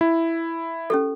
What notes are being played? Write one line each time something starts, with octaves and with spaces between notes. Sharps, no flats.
E4
C#4 G4 A4